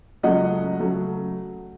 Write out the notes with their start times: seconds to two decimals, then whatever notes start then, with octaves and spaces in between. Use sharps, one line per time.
0.23 C#2 C#3 F#3 A3 D#5 F#5
0.80 C#3 F#3 A3